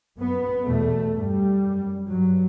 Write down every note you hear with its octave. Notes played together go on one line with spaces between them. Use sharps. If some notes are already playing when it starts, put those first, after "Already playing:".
F#2 B3
E2 B2 A3
G2 G3
F#2
G2 F#3